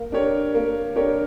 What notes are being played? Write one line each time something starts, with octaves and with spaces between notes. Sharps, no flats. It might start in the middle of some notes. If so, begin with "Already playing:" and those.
Already playing: A#3
D4 G4 A#4 C#5
A#3
D4 G4 A#4 C#5